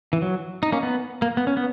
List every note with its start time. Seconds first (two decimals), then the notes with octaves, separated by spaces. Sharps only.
0.13 E3
0.22 F#3
0.63 D#4
0.72 A#3 C#4
0.83 B3
1.22 A#3
1.37 B3
1.47 C#4
1.57 B3